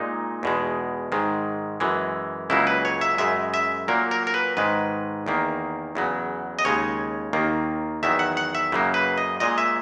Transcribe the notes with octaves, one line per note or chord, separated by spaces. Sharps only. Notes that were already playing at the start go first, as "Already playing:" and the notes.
Already playing: A#2 G#3 D#4
E2 B2 G#3
G#2 D#3 G#3
F#2 E3 G#3
C#2 C#3 F#3 A#3 E4
B4
C#5
E5
F#2 C#3 G#3 E5
E5
A#2 F#3 A#3 A#4
A#4
A#4
B4
G#2 D#3 G#3 B4
E2 D#3 A#3
E2 C#3 F#3
D#5
D#2 C#3 G#3 C#5
D#2 D#3 A#3
E2 D#3 F#3 E5
F#5
F#5
E5
F#2 C#3 F#3 A#3
B4
D#5
A#2 G#3 D#5
E5